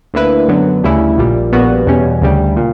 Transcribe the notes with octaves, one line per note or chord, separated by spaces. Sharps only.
D2 D3 A#3 E4 B4
F#2 D3 F#3 B3
D2 C#3 G3 C#4 E4
A#1 A#2 G3
A#1 A#2 G3 B3 F#4
E2 B2 G3 C#4
D2 C#3 G3
A#2